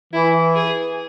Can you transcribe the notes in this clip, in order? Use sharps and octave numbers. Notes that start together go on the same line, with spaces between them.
E3 E4
G#4